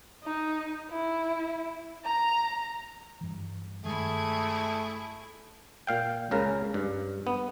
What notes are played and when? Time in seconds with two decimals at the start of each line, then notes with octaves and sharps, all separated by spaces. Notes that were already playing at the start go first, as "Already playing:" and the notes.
0.24 D#4
0.91 E4
2.05 A#5
3.21 G2 E3
3.84 G2 D#3 G#3 A3 E4 G#4
5.87 A#2 F5 G5
6.31 C#2 C#3 A#4
6.74 G2
7.27 B3